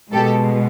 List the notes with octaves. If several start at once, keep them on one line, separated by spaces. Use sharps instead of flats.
B2 G#3 G4 A4